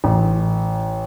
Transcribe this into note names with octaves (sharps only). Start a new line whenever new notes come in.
A1